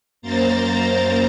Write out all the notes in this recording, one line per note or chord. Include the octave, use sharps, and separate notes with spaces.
F#2 A#3 C5 A#5 A6